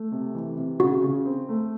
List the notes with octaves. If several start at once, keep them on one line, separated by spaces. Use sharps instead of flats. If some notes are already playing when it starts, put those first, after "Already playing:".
Already playing: A3
C3
E3
C3
C#3 F#4
C#3
C4
A3